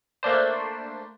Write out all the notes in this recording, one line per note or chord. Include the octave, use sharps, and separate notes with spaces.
A3 A#3 D4 C5